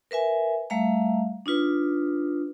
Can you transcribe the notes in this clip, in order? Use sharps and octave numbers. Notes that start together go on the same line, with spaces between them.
A#4 B4 E5 G#5
G3 A3 E5 F5 A#5
D4 D#4 F4 B4